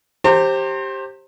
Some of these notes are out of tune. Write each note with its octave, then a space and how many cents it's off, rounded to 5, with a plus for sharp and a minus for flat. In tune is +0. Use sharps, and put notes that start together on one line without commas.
G4 +0 C5 +25 A#5 -35